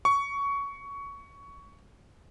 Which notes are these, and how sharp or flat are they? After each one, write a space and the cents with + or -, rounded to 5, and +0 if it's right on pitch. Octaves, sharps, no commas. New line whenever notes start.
C#6 +15